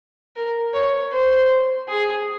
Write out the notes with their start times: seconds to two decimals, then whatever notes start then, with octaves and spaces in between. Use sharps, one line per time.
0.36 A#4
0.74 C#5
1.12 C5
1.89 G#4